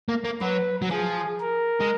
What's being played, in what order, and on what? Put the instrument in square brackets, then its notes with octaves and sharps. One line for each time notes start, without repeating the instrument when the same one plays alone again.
[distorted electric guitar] A#3
A#3
[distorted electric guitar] F#3 [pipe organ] B4
[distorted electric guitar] F#3
[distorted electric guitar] F3 [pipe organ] G#4
[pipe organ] A#4
[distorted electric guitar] G#3